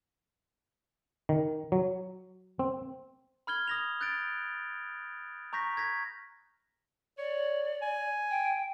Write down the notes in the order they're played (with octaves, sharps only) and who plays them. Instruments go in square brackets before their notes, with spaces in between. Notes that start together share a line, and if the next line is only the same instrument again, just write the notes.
[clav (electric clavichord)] D#3
F#3
C4
[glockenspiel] B5 F6 G#6 G7
D#6 A#6 F7
F#6 G6 A6 D7
A#5 C#6 G6 A#6 B6
G#6 A#6 B6
[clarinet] C#5 [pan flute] D5
[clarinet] G#5
[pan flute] G5